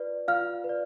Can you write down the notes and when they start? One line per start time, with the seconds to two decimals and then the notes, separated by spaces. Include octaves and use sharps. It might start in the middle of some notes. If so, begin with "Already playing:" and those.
Already playing: F4 B4 D5
0.28 F4 F5 F6
0.64 B4
0.69 D5